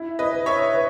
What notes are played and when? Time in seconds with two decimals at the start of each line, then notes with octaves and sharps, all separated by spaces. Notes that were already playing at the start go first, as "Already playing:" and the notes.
Already playing: E4
0.19 B4 D#5
0.33 B4
0.46 C#5 E5
0.74 B4